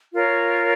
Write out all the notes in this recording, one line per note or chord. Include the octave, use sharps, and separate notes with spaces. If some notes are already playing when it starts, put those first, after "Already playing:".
F4 A#4 C#5